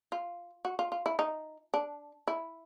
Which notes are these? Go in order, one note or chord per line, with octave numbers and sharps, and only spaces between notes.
F4
F#4
F4
F4
E4
D#4
D4
E4